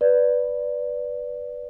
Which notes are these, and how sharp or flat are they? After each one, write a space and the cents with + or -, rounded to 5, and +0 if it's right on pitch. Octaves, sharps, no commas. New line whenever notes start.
B4 +0 D5 +0